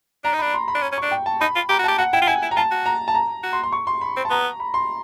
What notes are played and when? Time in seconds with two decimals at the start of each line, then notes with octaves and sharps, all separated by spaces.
0.24 D4 A#5
0.33 D#4
0.39 D4 B5
0.54 C6
0.68 B5
0.75 D4
0.82 C#4
0.92 C#4
0.98 D4 C#6
1.11 G5
1.26 A5
1.40 D#4 B5
1.56 F4
1.69 G4 A#5
1.79 F#4
1.84 G4 A5
1.98 F#4 F#5
2.13 E4 G5
2.22 F4
2.27 E4 G#5
2.42 E4
2.51 A#5
2.56 F4 A5
2.71 F#4
2.86 A#5
3.08 A5
3.15 A#5
3.43 F#4
3.53 C6
3.63 C6
3.72 C#6
3.87 C6
4.01 B5
4.17 C4
4.25 A5
4.30 B3 A#5
4.60 B5
4.74 C6